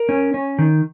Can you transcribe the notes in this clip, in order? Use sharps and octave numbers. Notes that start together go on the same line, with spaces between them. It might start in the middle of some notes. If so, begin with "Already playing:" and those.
Already playing: A#4
C#4
C#4
D#3